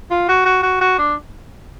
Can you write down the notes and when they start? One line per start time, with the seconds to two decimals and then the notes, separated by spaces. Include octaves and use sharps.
0.11 F4
0.29 F#4
0.45 F#4
0.63 F#4
0.81 F#4
0.98 D4